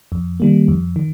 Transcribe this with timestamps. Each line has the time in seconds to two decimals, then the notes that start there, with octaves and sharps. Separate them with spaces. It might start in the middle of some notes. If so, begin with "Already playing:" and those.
0.12 F2
0.40 D#3 G3 A#3
0.68 F2
0.96 D#3